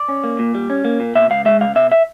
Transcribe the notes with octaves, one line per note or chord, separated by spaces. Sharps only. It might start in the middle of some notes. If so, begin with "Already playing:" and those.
Already playing: D5
C#4
A#3
A#2
G3
C#4
A#3
A#2
B2 E5
C#2 F5
G#3 E5
C#2 F5
B2 E5
E5